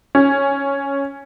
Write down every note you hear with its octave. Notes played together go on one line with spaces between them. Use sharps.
C#4